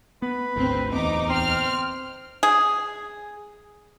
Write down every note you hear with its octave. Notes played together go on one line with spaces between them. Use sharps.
B3 B4
G#1 D2 C4
D1 E2 B3 D#4 D6
C4 F6
G#4